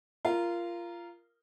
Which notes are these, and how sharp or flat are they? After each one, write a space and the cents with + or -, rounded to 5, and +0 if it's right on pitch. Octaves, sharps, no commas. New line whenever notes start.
F4 -20 A#4 +0